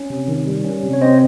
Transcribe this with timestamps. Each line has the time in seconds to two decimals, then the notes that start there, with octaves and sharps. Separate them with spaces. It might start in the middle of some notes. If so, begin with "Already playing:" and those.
Already playing: C#4
0.10 C3
0.28 D#3
0.47 G3
0.64 C#4
0.83 C3
0.93 C#5
1.01 C4 C5 D#5